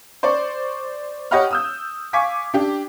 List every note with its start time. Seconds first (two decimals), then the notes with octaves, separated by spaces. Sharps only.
0.23 C5 D5 C#6
1.31 G4 C#5 D#5 F#5 B5 F6
1.51 D#6 E6 G6
2.13 F5 G#5 C#6 D6 G#6 B6
2.54 D4 G4